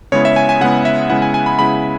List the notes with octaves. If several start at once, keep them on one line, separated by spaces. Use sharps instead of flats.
C#3 G#3 B3 E4 C#5
E5
G#5
G#5
C#3 G#3 B3 E4 F#5
E5
C#3 G#3 B3 E4 F#5
G#5
G#5
B5
C#3 G#3 B3 E4 B5